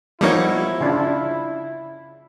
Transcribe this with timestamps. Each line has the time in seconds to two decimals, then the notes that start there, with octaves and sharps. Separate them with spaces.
0.21 F3 G3 A#3 B3 D#4 E4 C#5
0.81 C#3 D4 F4